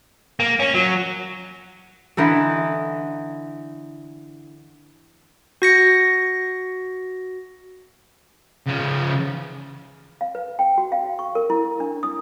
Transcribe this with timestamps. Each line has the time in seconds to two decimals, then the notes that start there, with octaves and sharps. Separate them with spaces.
0.40 A#3
0.60 C#4
0.74 F#3
2.17 D3 E3 D#4 A4
5.62 F#4 A#6 C#7
8.66 C#3 F3
10.21 F5
10.35 B4
10.59 G5
10.78 F#4
10.92 F5
11.19 C#6
11.35 A#4
11.50 E4
11.80 D4
12.03 D#6